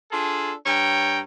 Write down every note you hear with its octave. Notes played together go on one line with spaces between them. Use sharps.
D4 F4 G#4 A4
G2 C#5 G5 A#5